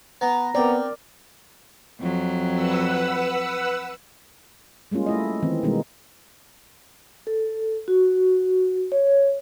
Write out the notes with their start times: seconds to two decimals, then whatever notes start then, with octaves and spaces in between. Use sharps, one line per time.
0.21 B3 A#5
0.55 B3 C4 A#4 D5
2.00 F2 F#3
2.54 B4 F#5 E6
4.91 G3 G#3 A#3 C#4 F4
5.06 A3 E4 D#5
5.42 D#3 E3 C4
5.63 B2 D#3 G3 G#3 A#3 D#4
7.27 A4
7.88 F#4
8.92 C#5